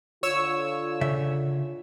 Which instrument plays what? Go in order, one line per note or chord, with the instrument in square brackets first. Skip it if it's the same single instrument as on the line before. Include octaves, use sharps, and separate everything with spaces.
[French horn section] D3 F4 [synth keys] C#5 E6
[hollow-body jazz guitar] C#3 E5